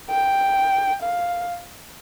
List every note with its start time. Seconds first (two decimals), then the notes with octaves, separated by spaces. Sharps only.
0.10 G5
1.03 F5